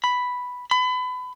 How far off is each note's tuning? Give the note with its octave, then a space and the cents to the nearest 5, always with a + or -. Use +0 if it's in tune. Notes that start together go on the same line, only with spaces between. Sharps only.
B5 +0
B5 +30